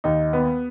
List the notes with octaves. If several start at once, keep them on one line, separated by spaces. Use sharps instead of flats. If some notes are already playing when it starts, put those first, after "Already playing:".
D#2 D#4
B3